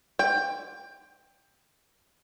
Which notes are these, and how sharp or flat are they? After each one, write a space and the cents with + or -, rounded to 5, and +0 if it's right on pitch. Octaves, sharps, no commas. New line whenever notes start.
G5 +15